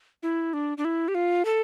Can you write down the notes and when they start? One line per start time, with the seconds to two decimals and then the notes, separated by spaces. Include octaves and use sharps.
0.23 E4
0.53 D4
0.78 D4
0.85 E4
1.08 G4
1.15 F4
1.45 A4